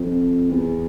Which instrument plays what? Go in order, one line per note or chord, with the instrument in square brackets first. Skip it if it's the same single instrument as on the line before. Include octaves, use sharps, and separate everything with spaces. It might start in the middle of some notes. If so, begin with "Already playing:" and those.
Already playing: [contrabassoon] F2
E2